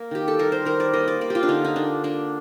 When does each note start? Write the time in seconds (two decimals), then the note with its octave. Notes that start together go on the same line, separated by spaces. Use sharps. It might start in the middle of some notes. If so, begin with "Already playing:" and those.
Already playing: A#3
0.11 D#3 G4
0.28 A4
0.39 G3 A#4
0.52 C5
0.65 D#3 A#4
0.80 D5
0.93 A#3 D#5
1.08 D5
1.21 A#3 D5
1.30 F4 G4
1.43 D4
1.48 D3 D#4
1.64 D#4
1.76 A#3 D4
2.04 A#3 D4